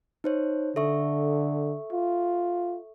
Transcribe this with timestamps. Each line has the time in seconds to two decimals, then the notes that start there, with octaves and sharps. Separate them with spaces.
0.24 D#4 C5 C#5
0.76 D3 A4 E5 C#6
1.92 F4